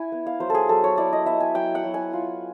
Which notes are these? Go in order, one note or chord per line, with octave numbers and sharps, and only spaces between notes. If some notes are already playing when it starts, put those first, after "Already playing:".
Already playing: E4 G#5
B3
F5
F#3 C5
G#4 A4
F#3 A4
C#5
E4 D5
D#5
B3 E5
G#5
F#3 G5
F#5
F#3
G#5
F4